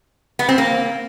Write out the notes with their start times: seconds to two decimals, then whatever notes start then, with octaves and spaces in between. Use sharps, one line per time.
0.39 B3
0.49 C4
0.58 A#3